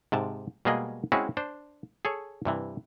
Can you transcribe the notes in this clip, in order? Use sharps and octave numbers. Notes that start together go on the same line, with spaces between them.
G#2 C3 A5
B2 G3 G#3 A#3 G#4 D#5
G#3 C4 C#4 E4 F#4 G#4
D4 C5
G#4 A4 C#5
G2 C3 E3